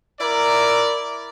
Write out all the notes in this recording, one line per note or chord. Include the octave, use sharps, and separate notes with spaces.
E4 A#4 D5